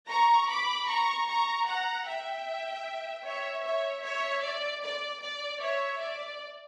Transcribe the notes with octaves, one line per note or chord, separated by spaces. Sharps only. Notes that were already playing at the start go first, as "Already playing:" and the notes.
A#5 C#6
B5 D6
A#5 C#6
A#5 C#6
F#5 A#5
E5 G5
C#5 E5
C#5 E5
C#5 E5
D5
D5
D5
C#5 E5
D5